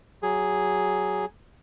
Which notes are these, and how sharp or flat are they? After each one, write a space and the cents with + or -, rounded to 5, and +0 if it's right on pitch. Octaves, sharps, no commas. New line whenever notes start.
F#3 +20 G#4 +0